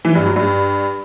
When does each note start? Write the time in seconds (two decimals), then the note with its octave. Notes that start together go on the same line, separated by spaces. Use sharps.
0.05 E3
0.15 G2
0.25 F#3
0.36 G2